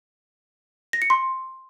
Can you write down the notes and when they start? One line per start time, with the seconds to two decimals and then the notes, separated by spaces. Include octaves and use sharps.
0.93 A#6
1.02 C#7
1.10 C6